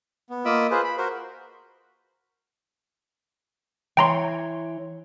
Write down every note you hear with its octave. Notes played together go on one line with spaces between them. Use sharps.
B3
A#3 F4 D#5 B5 D6 E6
F4 G#4 B4 C5
B5
F#4 A#4 C5
E3 C#5 G5 A#5 C6